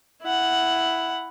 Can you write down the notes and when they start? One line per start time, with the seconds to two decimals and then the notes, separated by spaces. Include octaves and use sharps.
0.22 E4 F#5